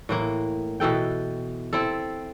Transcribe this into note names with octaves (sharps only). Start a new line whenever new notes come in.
A2 E3 A#3
B2 E3 A4 G5
C4 E4 A4